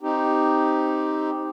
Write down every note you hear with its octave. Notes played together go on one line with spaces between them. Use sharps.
C4 D#4 G4